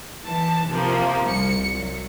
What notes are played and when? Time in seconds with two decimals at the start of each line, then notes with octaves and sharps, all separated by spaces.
0.25 E3 A5
0.70 C3 F3 A#3
1.29 C2 C#7
1.77 F#3